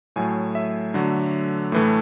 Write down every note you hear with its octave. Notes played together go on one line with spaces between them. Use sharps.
A2 F#3 A3 G#5
E5
D3 F#3 A3
A2 E3 A3